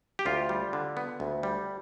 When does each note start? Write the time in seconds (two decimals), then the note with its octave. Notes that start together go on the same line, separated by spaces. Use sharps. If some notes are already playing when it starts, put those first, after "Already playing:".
0.19 G4
0.26 D2 F4
0.49 G3
0.73 D3
0.97 B3
1.20 D2
1.43 G3